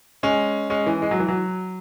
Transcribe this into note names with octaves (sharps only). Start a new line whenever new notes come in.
G#3 C#4
G#3 C#4
E3
G#3
F#3
E3
F#3